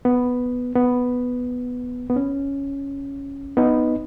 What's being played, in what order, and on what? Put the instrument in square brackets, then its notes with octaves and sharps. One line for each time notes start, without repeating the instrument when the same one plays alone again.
[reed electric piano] B3
B3
B3
C#4
B3 D#4